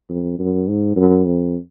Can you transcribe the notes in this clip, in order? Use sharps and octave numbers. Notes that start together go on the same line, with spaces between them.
F2
F#2
G#2
F#2
F2